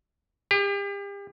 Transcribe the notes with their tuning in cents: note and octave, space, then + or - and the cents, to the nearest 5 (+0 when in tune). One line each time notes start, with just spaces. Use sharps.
G4 +40